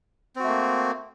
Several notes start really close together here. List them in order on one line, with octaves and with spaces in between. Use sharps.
C4 F#4 A3 A#3